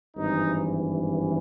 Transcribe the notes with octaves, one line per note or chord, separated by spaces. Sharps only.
G#1 G2 E3 D#4